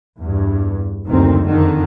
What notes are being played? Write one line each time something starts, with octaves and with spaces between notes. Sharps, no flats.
E2 G2
F#1 D2 D#3 C4
F2 D3 D#3